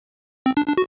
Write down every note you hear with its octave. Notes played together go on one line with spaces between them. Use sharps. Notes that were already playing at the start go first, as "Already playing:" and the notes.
C4
D4
D4
F#4